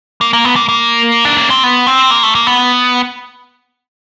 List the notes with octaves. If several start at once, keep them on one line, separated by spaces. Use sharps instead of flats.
A#3
A#3
B3
A#3
A#3
D4
C#4
C4
B3
C4
A#3
A3
A#3
B3